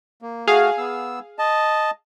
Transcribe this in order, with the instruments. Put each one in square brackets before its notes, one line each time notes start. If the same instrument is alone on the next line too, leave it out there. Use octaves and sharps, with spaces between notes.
[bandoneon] A#3
[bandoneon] A3 F#4 [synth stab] G#4 F5
[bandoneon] B3 E6
D#5 A5